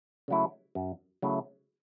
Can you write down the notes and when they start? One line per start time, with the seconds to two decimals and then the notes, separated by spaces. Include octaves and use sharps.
0.28 C#3 F#3 A3 E4
0.75 F#2
1.22 C#3 F#3 A3 E4